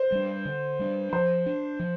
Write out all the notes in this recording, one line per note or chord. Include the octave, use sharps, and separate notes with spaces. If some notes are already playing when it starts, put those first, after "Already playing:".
Already playing: C5
G3 D4
D3
G3 D4
F3 C5
D4
F3